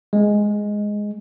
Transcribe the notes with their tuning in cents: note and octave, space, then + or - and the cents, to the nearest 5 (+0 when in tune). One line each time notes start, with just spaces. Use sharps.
G#3 +0